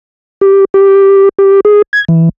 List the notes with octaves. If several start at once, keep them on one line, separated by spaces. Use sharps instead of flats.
G4
G4
G4
G#4
G#6
E3